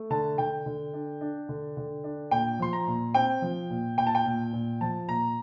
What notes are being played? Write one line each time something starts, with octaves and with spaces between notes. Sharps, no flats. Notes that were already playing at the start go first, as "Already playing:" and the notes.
Already playing: A3
D3 A5
D3 G5
D3
D4
D4
D3
D3
D4
A#2 G5
F3 C6
A#5
A#2
C4 G5
F3
A#2
A#2 G5
A5
G5
A#2
A#2
F3 A5
A#2 A#5